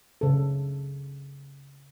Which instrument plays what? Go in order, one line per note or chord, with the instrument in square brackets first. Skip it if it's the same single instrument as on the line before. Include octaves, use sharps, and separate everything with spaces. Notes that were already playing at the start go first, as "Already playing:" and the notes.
[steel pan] C#3 A4